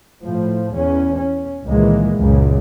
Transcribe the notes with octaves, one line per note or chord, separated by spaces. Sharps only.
A2 F3
E2 C#4
C#4
C#2 A#2 D#3 E3 G#3 A#3
C#2 F#2 A#2 C#3